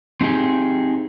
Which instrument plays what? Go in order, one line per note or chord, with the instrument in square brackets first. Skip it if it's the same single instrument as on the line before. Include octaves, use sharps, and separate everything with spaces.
[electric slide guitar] C4 D#4 G4 G#4